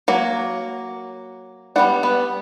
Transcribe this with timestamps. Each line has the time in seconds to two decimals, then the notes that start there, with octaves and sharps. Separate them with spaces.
0.08 F#3 A#3
1.76 G3 B3 D4 F#4 F#5
2.03 B3 B4